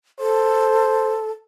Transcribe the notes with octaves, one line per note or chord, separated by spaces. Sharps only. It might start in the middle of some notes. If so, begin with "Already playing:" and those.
A4 C5